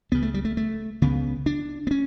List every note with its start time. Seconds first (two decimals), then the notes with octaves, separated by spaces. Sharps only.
0.12 C#2 C#3 B3
0.22 A3
0.34 G3
0.45 A3
0.57 A3
1.02 C#2 C#3 B3
1.46 D4
1.87 B3
1.91 C#4